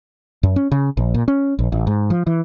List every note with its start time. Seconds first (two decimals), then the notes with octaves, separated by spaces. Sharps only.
0.43 F#2
0.56 C#4
0.72 C#3
0.97 A#1
1.14 A#2
1.28 C#4
1.59 A#1
1.72 A1
1.87 G#2
2.10 F3
2.27 E3